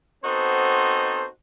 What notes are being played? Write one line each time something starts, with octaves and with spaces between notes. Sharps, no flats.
B3 C4 D#4 F#4 A4 C5